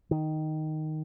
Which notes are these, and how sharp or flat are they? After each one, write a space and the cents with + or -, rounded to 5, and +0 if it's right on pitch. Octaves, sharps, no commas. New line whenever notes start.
D#3 +0